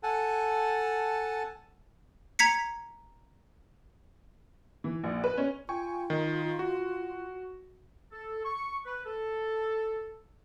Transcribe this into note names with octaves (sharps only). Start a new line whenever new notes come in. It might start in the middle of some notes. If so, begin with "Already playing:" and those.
A4 F#5 G#5 A5
A#5 G#6 B6 C#7
E3
A#1
B4
C#4
F4 G5 G#5 C#6
D#3
F#4
A4
C#6
B4
A4